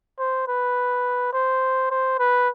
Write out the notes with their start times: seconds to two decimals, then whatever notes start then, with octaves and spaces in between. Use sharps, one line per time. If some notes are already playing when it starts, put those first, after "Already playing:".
0.19 C5
0.48 B4
1.33 C5
1.91 C5
2.19 B4